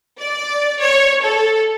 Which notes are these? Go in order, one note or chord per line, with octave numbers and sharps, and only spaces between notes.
D5
C#5
A4